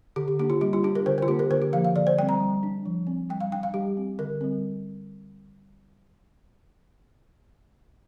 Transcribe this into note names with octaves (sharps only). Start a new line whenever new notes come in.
D3 G4
G4
A#3 D4 G4
F4
G3 G4
F4
D4 G4
A#4
D3 C5
F4 C5
A#3 D4 G4
A#4
D3 C5
G4
F3 A#3 F5
F5
D3 D5
C5
G3 C4 G5
A#5
G3
D4
F3
C4
G3 G5
F5
D4 G5
F5
G3 G4
C4
D3 A#4
G3 C4